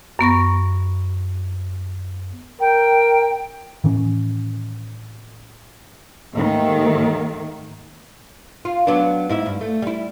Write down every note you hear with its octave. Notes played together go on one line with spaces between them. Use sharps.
F#2 B3 C#6 A#6
A#4 G5
A2 D#3 E3 C#4
D#2 G#2 D#3 A3
F4
F#3 B3 D4
G#2 E4 E5
G2
A3
G3 E4